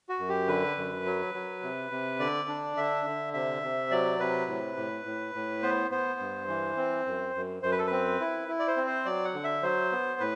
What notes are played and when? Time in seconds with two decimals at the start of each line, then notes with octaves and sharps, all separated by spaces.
0.09 F#4
0.19 F#2
0.29 G4
0.48 D3 B4
0.77 F#2
1.06 F#3
1.34 F#3
1.63 C3
1.91 C3
2.20 D3 D5
2.48 D4
2.77 D3 E5
3.06 D3
3.33 C3 E5
3.63 C3
3.91 F#3 D5
4.20 C3 B4
4.48 A2
4.77 A2
5.05 A2
5.35 A2
5.63 B3 C5
5.91 B3 C5
6.19 G2
6.48 E3
6.77 C4
7.06 F#2
7.35 F#2
7.63 F#2 C5
7.72 B4
7.79 A4
7.87 C4 B4
8.21 E4
8.48 E4
8.60 D5
8.68 C5
8.77 C4
8.87 C5
9.05 F#3 D5
9.25 F#5
9.34 D3
9.44 E5
9.63 F#3 C5
9.92 B3
10.20 A2 B4